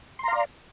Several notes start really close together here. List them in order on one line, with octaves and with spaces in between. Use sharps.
C6 A#5 F5 D5